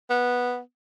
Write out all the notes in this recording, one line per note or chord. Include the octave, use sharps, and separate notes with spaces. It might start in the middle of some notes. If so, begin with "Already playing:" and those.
B3